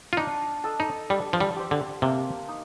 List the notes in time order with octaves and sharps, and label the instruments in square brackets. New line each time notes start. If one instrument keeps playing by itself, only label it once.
[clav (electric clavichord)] F4
[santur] D4 [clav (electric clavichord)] D#4
[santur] A4 D#5
[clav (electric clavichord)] D#4
[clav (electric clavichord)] G3 [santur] D4
[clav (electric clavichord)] F3
G3
[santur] G4 C5
[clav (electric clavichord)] D3
[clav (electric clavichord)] C3 [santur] A#3
[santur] D#4